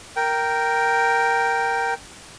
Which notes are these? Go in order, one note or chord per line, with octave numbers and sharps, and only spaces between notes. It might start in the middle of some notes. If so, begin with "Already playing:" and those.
A#4 G5